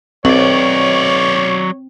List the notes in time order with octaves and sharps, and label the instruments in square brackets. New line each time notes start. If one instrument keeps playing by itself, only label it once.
[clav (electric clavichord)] B1 [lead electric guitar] F#3 D5 [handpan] C4 [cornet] C#5